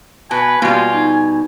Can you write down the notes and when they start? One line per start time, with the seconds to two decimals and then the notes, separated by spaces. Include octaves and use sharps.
0.31 B2 B4 G#5 A5
0.62 B2 G3 A#3 F4 F#4
0.94 D#4